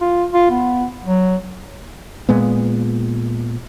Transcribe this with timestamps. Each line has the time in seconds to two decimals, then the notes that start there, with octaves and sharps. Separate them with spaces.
0.01 F4
0.34 F4
0.51 B3
1.05 F#3
2.29 A#2 G#3 B3